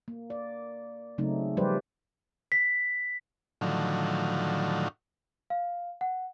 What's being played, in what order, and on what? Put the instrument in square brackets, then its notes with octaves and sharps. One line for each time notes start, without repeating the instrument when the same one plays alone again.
[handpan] A#3
D5
C#3 F#3 A3 C4 D#4
F3 G3 G4 B4 C5 D5
[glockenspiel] B6
[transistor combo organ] A2 D3 D#3 F3 F#3
[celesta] F5
F#5